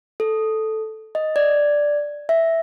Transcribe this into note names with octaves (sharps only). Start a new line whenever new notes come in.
A4
D#5
D5
E5